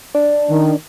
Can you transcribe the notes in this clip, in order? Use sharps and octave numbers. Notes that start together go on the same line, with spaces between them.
D4
D#3